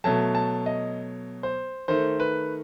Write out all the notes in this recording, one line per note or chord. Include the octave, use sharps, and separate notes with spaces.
B2 F#3 A3 A5
A5
D#5
C5
D#3 A3 C5
B4